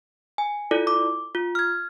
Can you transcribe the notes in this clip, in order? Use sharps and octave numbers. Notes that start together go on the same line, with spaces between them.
G#5
E4 F4 A4 D5
D6
F4
F6 G#6